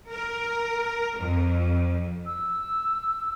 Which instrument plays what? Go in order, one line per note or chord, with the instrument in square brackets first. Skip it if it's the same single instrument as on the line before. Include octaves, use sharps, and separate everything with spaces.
[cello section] A#4
F2
[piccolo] E6